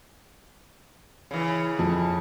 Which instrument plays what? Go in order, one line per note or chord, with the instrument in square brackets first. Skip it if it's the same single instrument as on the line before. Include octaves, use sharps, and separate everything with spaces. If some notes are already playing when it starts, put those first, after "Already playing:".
[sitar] C#3 E3
[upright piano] F2